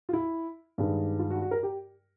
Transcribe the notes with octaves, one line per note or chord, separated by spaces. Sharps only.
F4
E4
G2 D#3 G#3 B3
F4
F#4
F#4
A#4
G4